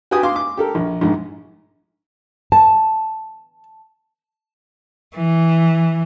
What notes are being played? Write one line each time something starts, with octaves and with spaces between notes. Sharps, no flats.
F#4 G4 B4 G5 G#5 D#6
F5 C6 D6
D6
G4 A4 A#4
A#1
A#1 G#2
A5
E3